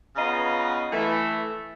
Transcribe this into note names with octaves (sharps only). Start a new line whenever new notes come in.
C#3 B3 F4 D#5 A#5
E3 A3